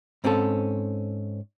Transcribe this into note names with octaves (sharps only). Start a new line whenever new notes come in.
G#2 C4 C#4 F4 A4